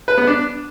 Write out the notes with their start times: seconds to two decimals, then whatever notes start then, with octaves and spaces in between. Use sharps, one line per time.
0.08 B4
0.18 B3
0.27 D4